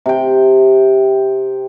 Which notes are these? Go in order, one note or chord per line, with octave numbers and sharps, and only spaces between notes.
C3 G5